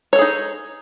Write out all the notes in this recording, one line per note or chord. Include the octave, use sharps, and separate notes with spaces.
D#4 G#4 A4 C#5